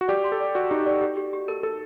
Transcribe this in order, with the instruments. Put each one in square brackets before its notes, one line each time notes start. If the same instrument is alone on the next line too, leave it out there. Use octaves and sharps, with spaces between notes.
[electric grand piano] F#4
[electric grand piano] G4 [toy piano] D5
[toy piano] C6
[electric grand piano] A4
[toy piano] D5
[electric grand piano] F#4 [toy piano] D5
[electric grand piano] D#4 [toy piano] G4
[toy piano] D5
G4
G4
G4
[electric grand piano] A4 [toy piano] A#4
[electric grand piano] A4 [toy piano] A#4